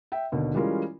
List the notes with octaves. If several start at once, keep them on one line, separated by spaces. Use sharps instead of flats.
E5 G5
D#2 B2 D3
E3 G3 G#3 C#4 F4 A#4